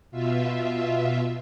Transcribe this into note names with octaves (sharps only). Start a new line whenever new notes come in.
B2 F4 E5